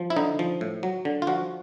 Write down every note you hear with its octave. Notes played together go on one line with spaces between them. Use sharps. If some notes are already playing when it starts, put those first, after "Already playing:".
Already playing: F3
E4
D3 D#4
F3
A2
F#3
D3
F4
F3 F#4